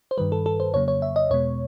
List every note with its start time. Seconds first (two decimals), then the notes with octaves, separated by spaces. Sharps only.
0.11 C5
0.18 G2 D#3 G3 B4
0.32 A4
0.46 A4
0.60 C5
0.74 F2 C#3 F#3 A#3 C#5
0.88 C#5
1.02 E5
1.16 D#5
1.30 E2 B2 G#3 B3 C#5